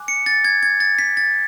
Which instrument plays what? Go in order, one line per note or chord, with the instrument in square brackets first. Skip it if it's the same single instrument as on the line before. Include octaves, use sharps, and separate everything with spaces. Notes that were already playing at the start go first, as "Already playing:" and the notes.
Already playing: [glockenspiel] G#5 D6 F#6
C#7
A6
G#6
G#6
A6
B6
A6